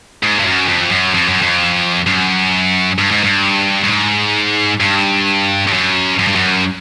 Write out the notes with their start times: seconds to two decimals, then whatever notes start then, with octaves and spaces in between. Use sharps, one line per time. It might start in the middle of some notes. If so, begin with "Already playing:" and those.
0.23 G#2
0.39 G2
0.46 F#2
0.68 F2
0.91 F#2
1.14 F2
1.28 F#2
1.42 F2
2.07 F#2
2.98 G2
3.11 G#2
3.24 G2
3.84 G2
3.89 G#2
4.80 G2
5.67 G2
5.73 F#2
6.19 F#2
6.27 G2
6.36 F#2